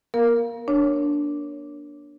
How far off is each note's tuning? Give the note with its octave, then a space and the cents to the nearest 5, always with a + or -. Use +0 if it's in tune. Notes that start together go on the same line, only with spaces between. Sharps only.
A#3 +45 A#4 +0 F5 +0
D4 +0 C#5 +0